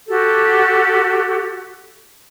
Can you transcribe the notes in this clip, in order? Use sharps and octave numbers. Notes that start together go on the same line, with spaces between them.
F#4 G4 A4